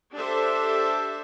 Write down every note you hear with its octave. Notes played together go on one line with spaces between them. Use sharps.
D4 G4 A4 C5 E5